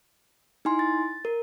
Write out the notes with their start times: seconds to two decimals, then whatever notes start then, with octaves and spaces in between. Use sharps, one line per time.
0.65 D#4 E4 G#5 C6
0.79 A6
1.25 A#4